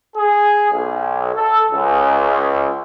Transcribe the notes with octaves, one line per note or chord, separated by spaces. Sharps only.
G#4
B1
A4
C#2